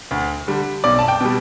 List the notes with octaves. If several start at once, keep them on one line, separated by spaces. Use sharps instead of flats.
D2
D3 G3
B1 D5
A5
G5
B2 G3